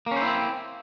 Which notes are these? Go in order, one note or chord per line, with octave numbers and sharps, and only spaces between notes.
A#3 C4 C#4 E4 C5